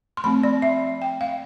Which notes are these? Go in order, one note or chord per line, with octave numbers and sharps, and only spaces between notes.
C6
F3 A3 C4 B5
D5
E5
G5
F5